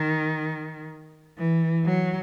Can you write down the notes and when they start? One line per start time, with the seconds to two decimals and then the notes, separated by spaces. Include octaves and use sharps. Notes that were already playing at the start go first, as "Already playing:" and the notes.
Already playing: D#3
1.38 E3
1.85 F#3